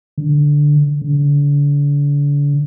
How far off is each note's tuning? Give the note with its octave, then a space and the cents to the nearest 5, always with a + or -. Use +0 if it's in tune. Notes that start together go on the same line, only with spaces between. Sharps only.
D3 +0
D3 -35